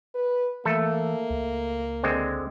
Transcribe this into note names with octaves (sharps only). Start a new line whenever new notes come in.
B4
E3 A3 A#3 A4
C#2
D3 G#3 C4